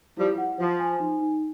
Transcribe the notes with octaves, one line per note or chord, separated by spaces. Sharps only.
F3 G3 E4
F#5
F3 C5
G#5
D#4
D#4